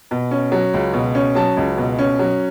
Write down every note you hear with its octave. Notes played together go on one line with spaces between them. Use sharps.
B2
C#4
F#3
C#2
B2
C#4
F#3 A5
C#2
B2
C#4
F#3